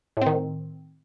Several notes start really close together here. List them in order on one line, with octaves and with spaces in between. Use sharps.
A2 C4 D#3